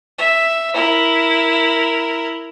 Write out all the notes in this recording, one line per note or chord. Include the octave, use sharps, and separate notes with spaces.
E5
E4 A#4